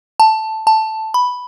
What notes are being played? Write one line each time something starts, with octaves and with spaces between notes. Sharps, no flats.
A5
A5
B5